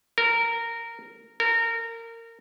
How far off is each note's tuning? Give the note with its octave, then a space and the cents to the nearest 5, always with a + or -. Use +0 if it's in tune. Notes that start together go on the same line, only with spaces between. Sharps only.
A#4 -15
A#4 -25